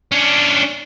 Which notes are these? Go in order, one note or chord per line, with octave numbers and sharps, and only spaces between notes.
C#4 D4